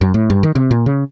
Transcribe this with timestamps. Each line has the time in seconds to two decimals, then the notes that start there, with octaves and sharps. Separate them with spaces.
0.01 F#2
0.14 A2
0.30 G2
0.43 D#3
0.55 C3
0.71 A#2
0.86 C#3